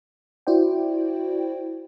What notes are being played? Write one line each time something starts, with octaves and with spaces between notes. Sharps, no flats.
E4 F#4 C5 D5 G5